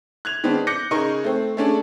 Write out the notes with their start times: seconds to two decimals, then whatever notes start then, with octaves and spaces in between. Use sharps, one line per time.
0.25 F#6 G#6 F7
0.44 D#3 G#3 B3 C4 D4
0.67 D6 F#6 G6 A#6 C#7
0.91 C#3 D#4 G#4 A#4 C#6
1.24 A3 C4
1.57 A3 C#4 D4 G#4